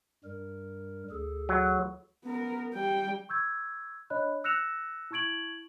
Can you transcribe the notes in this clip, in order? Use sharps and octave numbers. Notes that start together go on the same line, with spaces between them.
G2 G3 A#4
D2 G#4 A4
F#3
B3 A#4
G3 G5
C#6 E6 G6 G#6
D4 C#5 D#5 B5 F#6
E6 F#6 A#6 C#7 E7 F7
E4 A5 C#6 G#6 D7 F#7